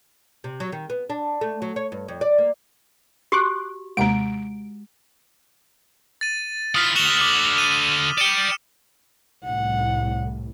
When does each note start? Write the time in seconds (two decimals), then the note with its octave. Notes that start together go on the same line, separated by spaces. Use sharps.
0.44 C3
0.60 F#3
0.72 D#3
0.90 B3
1.10 D4
1.41 A3
1.62 F#3
1.76 C#5
1.92 G2
2.08 F2
2.21 D5
2.38 A#3
3.32 F#4 G4 C6 D6 F#6
3.97 D#2 C3 G#3 A#5 D7
6.21 A6 D#7
6.75 E3 F4 D#6 F6 B6
6.96 D3 F#4 E7 F7 G7
7.17 D6 G7
7.58 D#7
8.18 D5 G5 C#7 D#7 E7
9.45 C2 A2 F#5